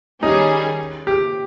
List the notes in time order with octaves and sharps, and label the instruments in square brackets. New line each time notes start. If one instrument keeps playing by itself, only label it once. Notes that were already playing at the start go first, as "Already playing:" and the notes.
[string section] D#3 G3 C#4 G#4 [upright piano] D#4
[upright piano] G4